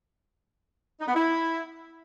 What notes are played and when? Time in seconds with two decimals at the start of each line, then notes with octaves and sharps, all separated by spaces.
1.01 D#4
1.08 B3
1.15 E4